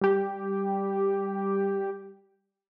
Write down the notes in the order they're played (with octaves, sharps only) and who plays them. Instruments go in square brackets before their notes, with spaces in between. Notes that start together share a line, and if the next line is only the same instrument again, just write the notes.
[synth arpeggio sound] G3 G4